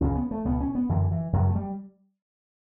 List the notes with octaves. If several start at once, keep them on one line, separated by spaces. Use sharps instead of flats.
C#2 C#3 C#4
B3
A3
C#2 B2 B3
C#4
B3
F#2 D3 E3
E3
F#2 C#3 F#3
A3
G3